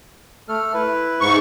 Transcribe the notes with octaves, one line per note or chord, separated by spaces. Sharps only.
A3 A4 F6
E4 B4
G#2 C#6